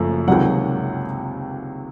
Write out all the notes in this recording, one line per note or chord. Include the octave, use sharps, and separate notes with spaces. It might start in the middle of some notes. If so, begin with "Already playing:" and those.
Already playing: F#1 F#2 F3 A3
C#2 C3 D#3 F#3 F#5